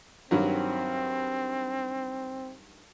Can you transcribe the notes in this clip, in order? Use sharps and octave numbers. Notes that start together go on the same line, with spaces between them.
G2 D#3 F#3 C4